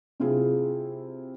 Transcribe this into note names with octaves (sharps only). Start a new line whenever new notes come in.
C3 E4 F4 G#4